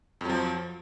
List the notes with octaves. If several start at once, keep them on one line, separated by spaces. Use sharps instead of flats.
F2 F3 F#3